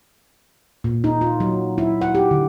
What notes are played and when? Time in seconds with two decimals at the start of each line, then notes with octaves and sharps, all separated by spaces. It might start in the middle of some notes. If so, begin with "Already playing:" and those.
0.84 A#2
1.04 D#4
1.21 F4
1.40 F#3
1.78 E4
2.01 F#5
2.15 G4
2.31 D3